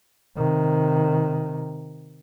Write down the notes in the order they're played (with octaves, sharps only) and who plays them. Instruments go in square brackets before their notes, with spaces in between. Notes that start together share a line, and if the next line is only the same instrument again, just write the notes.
[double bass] C3 D#3